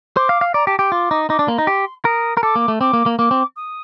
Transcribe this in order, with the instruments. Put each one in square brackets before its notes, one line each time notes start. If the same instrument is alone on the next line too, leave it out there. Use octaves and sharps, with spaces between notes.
[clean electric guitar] C5 [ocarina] D6
[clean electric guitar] F5
F5
[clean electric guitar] D5 [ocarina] A#5
[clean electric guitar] G4 [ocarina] A5
[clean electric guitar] G4 [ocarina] C6
[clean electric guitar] F4 [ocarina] D6
[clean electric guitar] D#4
[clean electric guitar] D#4 [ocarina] D6
[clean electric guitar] D4
[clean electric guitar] A#3 [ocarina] C6
[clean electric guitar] D#4 [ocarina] A#5
[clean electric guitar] G4 [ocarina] C6
[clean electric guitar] A#4 [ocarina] D#6
[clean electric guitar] A#4
[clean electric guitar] A4 [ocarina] D6
[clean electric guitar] A#3
A3
[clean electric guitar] C4 [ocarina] D6
[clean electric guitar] A#3
A#3
[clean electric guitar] A#3 [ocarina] D6
[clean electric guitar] C4
[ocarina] D#6